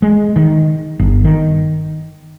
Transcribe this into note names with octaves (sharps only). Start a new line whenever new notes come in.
G#3
D#3
G1
D#3